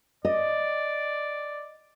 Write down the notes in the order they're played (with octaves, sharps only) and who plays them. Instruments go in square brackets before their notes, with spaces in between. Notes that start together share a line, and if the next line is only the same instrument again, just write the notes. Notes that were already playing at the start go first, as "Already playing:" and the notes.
[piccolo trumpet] D5 [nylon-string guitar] D#5